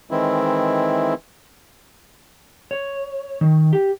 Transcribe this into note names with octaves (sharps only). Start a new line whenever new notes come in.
D#3 E3 G#3 C4 E4
C#5
D#3
G4